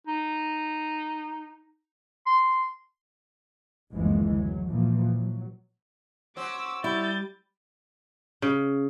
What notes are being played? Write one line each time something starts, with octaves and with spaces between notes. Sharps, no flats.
D#4
C6
F#1 D2 E3 F3 G#3
F#3
A#2 E3 F3 A#3
F#3
C#4 F#4 C5 D6 E6
G3 E4 G6 A6
C#3